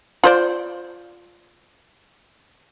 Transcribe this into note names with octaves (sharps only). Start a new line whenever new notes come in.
F4 C5 D5